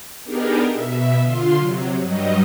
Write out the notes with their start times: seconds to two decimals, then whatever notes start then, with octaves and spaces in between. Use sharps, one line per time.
0.24 B3 D4 D#4 G4 G#4 A#4
0.72 B2 E5
1.22 D3 F4 C6
1.56 C3 F#3
2.00 G2 F#3 G3 D#5